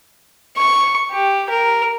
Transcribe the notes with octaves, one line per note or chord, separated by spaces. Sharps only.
C#6
G4
A#4